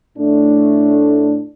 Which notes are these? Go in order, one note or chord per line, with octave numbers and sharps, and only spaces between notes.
A2 A3 D4